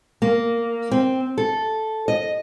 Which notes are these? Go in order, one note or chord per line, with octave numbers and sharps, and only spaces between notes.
A#3
C4
A4
D#5